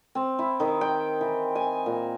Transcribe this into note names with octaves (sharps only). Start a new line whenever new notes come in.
C4
E4
D#3
G5
E3
G#5
A#2